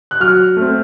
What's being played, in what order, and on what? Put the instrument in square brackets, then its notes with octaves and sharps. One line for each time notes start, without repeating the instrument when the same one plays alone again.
[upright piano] F#6
[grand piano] F#3 [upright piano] F6
[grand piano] A3 C4